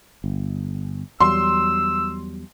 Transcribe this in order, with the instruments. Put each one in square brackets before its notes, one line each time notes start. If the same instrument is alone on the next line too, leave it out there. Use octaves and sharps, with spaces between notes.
[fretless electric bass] G1
[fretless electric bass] E2 F#3 G3 [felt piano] C6 [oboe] E6